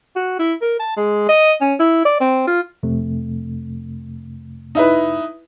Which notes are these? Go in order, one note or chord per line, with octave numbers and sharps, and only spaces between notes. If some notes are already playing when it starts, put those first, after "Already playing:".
F#4
E4
A#4
A5
G#3
D#5
C#4
E4
D5
C4
F4
F2 C3 A3
D#4 E4 B4